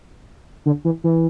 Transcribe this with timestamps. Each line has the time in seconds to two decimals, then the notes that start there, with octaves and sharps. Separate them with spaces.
0.66 D3
0.85 E3
1.04 E3